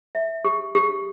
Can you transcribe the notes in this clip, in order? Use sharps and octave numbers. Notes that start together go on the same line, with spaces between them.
E5
G4
G4